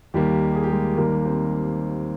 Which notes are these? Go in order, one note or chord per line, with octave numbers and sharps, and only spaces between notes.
D#2 D#3 G3 A#3 G4
G#4
G4
G#3 G#4
D#2 D#3 G3 A#3 A#4
C4 C5